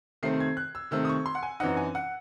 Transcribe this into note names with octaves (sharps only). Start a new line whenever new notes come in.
C3 D#3 A3 C4 C7
G#6
F#6
E6
C3 D#3 A3 C4 E6
D#6
C#6
C6
F#5
G#5
F#2 E3 C4 D#4 F#5
G#5
F#5